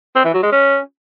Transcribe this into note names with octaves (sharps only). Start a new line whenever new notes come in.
C4
E3
F#3
G#3
C#4